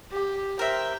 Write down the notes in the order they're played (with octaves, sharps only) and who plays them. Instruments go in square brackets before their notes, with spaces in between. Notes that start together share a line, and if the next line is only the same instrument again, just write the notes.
[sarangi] G4
[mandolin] A#4 C5 E5 [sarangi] G5